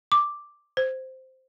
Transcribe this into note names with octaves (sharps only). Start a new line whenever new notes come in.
D6
C5